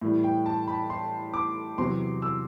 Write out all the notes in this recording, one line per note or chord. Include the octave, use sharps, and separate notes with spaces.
A2 E3 G3
G5
A5
B5
C6
D6
E2 C3 F#3 C6
E6